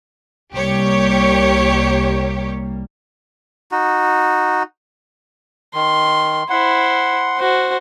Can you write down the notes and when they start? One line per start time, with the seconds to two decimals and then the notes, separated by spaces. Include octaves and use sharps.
0.53 C2 G3 A#3 G4 C#5
3.71 D#4 F#4
5.75 D#3 C6
6.50 E4 C5 F#5 C6
7.38 F#4 C5